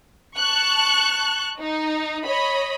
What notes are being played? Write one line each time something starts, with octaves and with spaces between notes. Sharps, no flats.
A5 C#6 F#6
D#4
C#5 D#5 B5